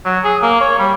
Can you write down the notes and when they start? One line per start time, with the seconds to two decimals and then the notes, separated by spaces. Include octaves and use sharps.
0.05 F#3
0.24 G#4
0.43 A#3
0.61 C#5
0.79 G3